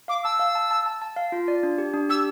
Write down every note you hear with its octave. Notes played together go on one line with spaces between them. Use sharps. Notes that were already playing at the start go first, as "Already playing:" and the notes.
F5 D6
A5 E6
F5
A5
A5
A5
A5
F5
F4
D5
D4
G4
D4
G4 E6